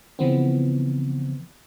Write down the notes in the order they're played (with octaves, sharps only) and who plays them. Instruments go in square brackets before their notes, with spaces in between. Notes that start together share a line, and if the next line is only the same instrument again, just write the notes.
[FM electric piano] C#3 E3 F3 B3 C4